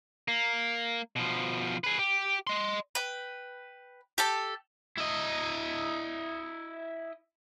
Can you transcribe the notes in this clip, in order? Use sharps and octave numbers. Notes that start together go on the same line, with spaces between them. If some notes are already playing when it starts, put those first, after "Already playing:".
A#3
B2 F3
G#4 B4
G4
D#5 C6
B4 G5
G4 A4 A5
E4 D#5